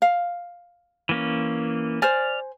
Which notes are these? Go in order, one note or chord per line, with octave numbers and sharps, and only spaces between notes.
F5
E3 A#3 C#4
C5 D5 G#5 F6